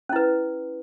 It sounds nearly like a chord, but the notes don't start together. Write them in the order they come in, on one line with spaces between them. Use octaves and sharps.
C#4 E4 B4